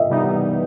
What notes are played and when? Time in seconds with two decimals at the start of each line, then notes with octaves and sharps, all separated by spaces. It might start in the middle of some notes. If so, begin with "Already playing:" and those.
Already playing: D#5 E5
0.10 C3 E3 G3 B3 D#4